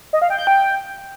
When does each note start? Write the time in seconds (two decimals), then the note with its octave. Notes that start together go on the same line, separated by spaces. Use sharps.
0.13 D#5
0.22 F5
0.30 G5
0.39 G6
0.47 G5